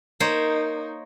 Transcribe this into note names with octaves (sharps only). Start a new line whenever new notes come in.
A#3 D#4 C5 C#5